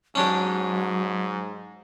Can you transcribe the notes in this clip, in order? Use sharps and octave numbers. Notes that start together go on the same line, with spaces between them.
G#2 F#3 C#4 D4 G4